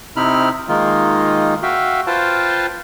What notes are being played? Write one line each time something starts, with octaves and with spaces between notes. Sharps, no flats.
C3 C4 D#4 E4 B5 F6
D#3 G#3 A#3 D#4 F4
F#4 E5 F5 G5
F4 B4 C5 F5 G5 A5